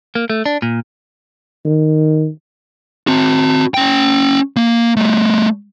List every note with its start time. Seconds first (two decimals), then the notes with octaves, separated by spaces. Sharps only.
0.15 A#3
0.30 A3
0.46 D4
0.62 A#2
1.65 D#3
3.07 C4 F#4
3.74 C#4 G5
4.57 A#3
4.97 G3 A3